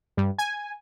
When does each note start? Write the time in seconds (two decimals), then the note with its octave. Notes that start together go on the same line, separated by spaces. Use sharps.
0.17 G2
0.38 G#5